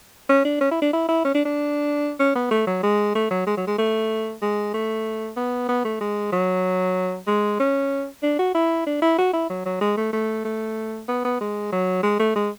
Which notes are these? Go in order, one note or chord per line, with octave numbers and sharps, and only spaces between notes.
C#4
D4
C#4
E4
D4
E4
E4
C#4
D4
D4
C#4
B3
A3
F#3
G#3
A3
F#3
G#3
F#3
G#3
A3
G#3
A3
B3
B3
A3
G#3
F#3
G#3
C#4
D4
F#4
E4
D4
E4
F#4
E4
F#3
F#3
G#3
A3
A3
A3
B3
B3
G#3
F#3
G#3
A3
G#3